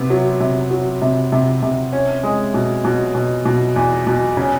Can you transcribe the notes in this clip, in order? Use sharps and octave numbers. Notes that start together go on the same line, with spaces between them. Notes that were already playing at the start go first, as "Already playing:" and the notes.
Already playing: C3 B3
F#3
C3
F#3
C3
C3
C3
C#4
G#3
B2
B2
B2
B2
E2
B2
C#3